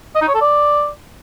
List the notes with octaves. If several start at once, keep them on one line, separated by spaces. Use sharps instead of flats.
D#5
D#4
C#5
A4
D5